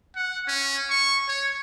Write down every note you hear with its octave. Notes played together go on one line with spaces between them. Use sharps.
F#5
C#4
C#6
C#5